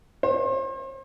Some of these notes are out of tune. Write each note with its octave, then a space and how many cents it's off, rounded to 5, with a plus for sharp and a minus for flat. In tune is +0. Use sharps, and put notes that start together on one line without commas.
C5 +40